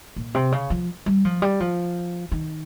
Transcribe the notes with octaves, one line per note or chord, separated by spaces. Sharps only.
A#2
C3
C#3
F3
G3
F3
G3
F3
D#3